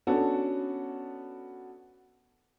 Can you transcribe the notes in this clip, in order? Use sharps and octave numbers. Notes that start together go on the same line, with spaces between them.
B3 C#4 D4 F#4 A4